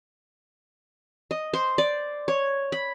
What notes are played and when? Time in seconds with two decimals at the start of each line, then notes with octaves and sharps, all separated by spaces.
1.31 D#5
1.54 C5
1.78 D5
2.28 C#5
2.72 B5